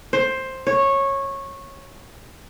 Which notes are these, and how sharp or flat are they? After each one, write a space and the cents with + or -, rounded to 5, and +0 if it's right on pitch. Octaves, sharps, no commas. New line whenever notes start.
C5 +10
C#5 -15